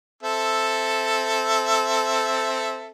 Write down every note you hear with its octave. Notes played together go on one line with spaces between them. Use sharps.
C4 A4 E5